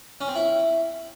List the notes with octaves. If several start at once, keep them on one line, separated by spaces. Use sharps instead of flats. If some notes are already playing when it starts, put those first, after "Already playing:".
C#4
C4
E4